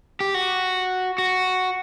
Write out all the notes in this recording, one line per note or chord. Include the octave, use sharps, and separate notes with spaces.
G4
F#4
F#4